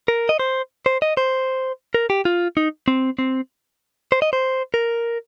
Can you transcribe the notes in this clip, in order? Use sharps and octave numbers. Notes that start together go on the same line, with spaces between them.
A#4
D#5
C5
C5
D#5
C5
A#4
G4
F4
D#4
C4
C4
C5
D#5
C5
A#4